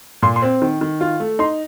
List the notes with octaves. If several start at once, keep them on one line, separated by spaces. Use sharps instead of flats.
A#2 C6
C6
C4
D#3
D#3
F4
A3
D#4 C6